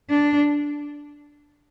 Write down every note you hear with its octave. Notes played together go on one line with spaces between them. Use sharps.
D4